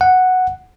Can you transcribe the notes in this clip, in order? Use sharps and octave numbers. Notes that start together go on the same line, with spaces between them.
F#5